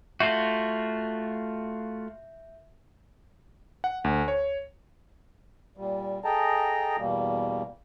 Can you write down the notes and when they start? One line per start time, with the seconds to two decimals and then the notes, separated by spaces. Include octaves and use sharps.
0.20 A3 F4 F#4 E5 G6
3.84 F#5
4.04 D2
4.28 C#5
5.77 A#2 G3
6.25 G#4 A4 D#5 G5 A5 A#5
6.98 E2 B2 G3 A#3